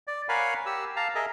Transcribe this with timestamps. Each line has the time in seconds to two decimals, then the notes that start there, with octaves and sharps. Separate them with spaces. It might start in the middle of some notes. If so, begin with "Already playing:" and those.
0.07 D5
0.29 A#4 C#5 F5 F#5 G#5 B5
0.66 G4 E6
0.96 F5 A5 A#5
1.15 G#4 A#4 D#5 E5